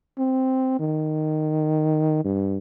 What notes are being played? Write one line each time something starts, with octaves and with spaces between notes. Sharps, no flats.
C4
D#3
G2